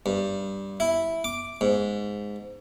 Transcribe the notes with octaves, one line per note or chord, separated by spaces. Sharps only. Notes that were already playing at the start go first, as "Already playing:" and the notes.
G2
E4
D6
G#2